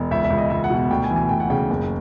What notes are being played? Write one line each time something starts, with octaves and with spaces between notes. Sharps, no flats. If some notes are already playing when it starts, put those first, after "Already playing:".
Already playing: E1
C#2 E5
E5
C#2
D#5
C#2 E5
F#5
B2
F#5
D2 G5
G#5
E3
G#5
D2 G5
F#5
C#3 G5
F#1